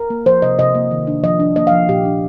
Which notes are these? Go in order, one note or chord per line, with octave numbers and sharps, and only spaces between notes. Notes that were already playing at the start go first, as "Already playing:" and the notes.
Already playing: A#4
A#3
F3 C5
C3 D#5
C3 D#5
A#3
D#3
D4
F3 D#5
D4
A#3 D#5
F3 F5
A#2 G4
D4